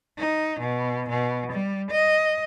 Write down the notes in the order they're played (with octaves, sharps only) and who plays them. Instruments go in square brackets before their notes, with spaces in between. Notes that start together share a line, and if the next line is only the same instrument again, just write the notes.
[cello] D#4
B2
B2
G3
D#5